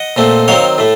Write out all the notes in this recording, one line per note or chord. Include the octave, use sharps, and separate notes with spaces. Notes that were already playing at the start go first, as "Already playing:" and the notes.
Already playing: D#5 F#5
A#2 A3 C4
D#3 F#3 C4 C#5 F5
A2 A3